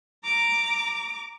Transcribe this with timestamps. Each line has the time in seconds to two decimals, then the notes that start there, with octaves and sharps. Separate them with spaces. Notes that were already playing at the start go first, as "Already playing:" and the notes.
0.24 A#5 D6